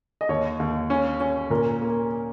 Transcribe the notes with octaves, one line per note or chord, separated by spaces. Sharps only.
D#5
D#2 C#5
D#2
C#4
C#4
A#2 A#4
A#3